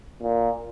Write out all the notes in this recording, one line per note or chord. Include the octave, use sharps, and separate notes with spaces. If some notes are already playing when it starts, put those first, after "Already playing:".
A#2